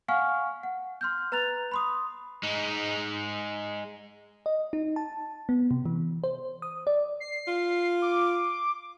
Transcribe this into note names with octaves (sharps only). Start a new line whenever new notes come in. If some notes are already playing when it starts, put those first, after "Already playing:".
F5 F#5 G#5 C#6 F6
F#5
C6 F6 G6
B4 A#5 F#6 A6 F7
B5 C6 D#6
G#3 D#4
D#5
D#4
A5
B3
C3
E3
C5
D#6
D5
C7
F4
D6